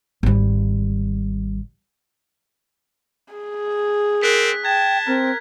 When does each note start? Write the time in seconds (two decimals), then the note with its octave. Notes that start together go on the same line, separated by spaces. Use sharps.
0.23 G#1 G3
3.33 G#4
4.22 C4 A#4 F#6 B6
4.65 G5 A5 G#6
5.07 C4 A#4